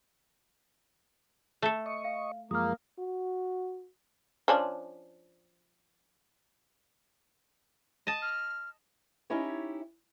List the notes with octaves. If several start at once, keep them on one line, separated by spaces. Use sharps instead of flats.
A3 A4
D#5 C#6
F5
F#2 F3 G#3 A#3 D#6 F6
F#4
F3 C#4 D4
D#5 A5
F6
C#4 D#4 E4 G4 C#5